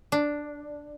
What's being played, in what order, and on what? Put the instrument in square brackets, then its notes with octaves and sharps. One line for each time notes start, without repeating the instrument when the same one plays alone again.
[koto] D4